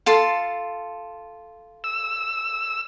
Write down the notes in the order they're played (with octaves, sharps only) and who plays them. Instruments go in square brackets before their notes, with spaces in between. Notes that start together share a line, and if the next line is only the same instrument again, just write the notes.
[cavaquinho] F4 A4 C6
[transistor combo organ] E6